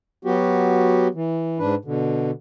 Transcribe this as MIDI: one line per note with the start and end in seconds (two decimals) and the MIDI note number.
0.25 1.07 54
0.25 1.07 59
0.25 1.07 66
0.25 1.07 67
1.14 1.59 52
1.59 1.75 44
1.59 1.75 62
1.59 1.75 71
1.85 2.31 47
1.85 2.31 50